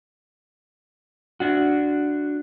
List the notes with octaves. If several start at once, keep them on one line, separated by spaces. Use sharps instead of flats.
D4 F#4